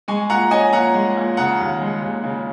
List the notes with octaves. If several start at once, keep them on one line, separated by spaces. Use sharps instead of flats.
G#3 G#5 C#6
A#2 F#5 A#5
C#4 D#5 G#5
A#2 F#5 A#5
G#3
A#2
C#3 F#5 A#5
D#2
G#3
D#2
C#3